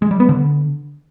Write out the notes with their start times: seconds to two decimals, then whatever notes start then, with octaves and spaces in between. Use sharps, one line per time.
0.02 G#3
0.11 G3
0.20 B3
0.29 D3